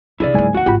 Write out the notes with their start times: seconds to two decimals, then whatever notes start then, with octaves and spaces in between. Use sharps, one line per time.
0.20 C3 D4 E4 G#4 D5
0.34 C#2 G#2 F#3 A#3 G#5
0.54 D#2 F#4 F#5
0.66 G#1 F4 G4 G5 B5